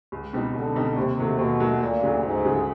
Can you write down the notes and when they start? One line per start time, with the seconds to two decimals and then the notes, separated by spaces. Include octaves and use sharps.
0.12 C#2
0.33 B2 G3 C4 D#4
0.54 C#2 D3
0.75 B2 G3 C4 D#4
0.96 D#2 C3
1.18 D#3 F#3 A3
1.39 D#2 B2
1.60 D#3 F#3 A3
1.81 D2 A#2
2.03 C#3 F#3 A3
2.23 D2 G#2
2.45 C#3 F#3 A3